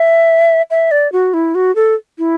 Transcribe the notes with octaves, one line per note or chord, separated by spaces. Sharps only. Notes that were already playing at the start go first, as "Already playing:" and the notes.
Already playing: E5
E5
D5
F#4
E4
F#4
A4
E4